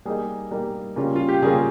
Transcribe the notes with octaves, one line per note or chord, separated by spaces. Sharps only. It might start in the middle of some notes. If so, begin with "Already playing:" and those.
G3 A#3 D#4 G#4
G3 A#3 D#4
C#3 G3 A#3 C#4 F4
F4
G4
C#3 G3 A#3 C#4 F4 G#4